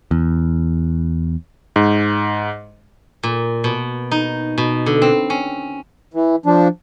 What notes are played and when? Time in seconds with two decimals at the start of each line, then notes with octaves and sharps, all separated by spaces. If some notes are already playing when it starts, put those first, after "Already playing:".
0.11 E2
1.76 G#2
3.23 A#2
3.64 B2
4.11 D#4
4.58 B2
4.86 D3
5.02 C4
5.30 C#4
6.14 E3
6.46 F3 D4